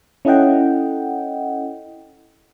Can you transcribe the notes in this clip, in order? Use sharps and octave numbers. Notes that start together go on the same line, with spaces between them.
C#4 E4 A4 D#5 F#5 G5